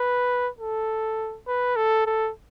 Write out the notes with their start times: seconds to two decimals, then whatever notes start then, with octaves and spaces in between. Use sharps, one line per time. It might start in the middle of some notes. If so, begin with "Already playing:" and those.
Already playing: B4
0.59 A4
1.47 B4
1.76 A4
2.06 A4